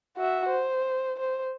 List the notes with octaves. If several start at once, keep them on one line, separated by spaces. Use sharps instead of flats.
F#4 E5
C5
C5